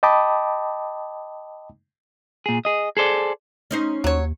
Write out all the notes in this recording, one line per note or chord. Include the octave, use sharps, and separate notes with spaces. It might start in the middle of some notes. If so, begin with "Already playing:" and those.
D#5 G5 A5 B5 D6 D#6
A#2 G#4
G#4 D#5
G#4 A4 C5 D5
C#4 D#4 C5
D#2 F#3 C#5